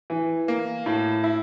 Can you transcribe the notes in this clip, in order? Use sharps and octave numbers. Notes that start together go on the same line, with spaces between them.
E3
A#3
A2
E4